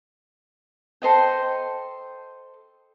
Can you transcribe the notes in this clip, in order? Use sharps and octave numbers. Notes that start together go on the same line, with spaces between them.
A4 C5 D#5 G5